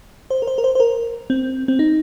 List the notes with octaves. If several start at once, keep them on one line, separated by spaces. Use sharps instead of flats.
C5
A#4
C5
A#4
C5
C5
A#4
C4
C4
D#4